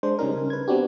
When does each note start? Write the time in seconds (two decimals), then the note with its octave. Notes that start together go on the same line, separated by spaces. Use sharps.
0.03 G#3 D4 C5
0.19 C#3 G3 C#4 D#4 A#4
0.34 C#3
0.50 B4 G#6
0.68 B3 C4 D4 F#4 G4